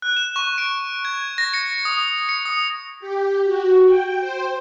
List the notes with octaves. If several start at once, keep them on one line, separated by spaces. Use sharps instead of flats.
F#6
E7
C#6
D7
G#6
A#6
C#7
D#6
C#7
D#6
G4
F#4
G5
C5